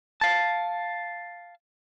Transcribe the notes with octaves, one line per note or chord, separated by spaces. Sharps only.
F5 A5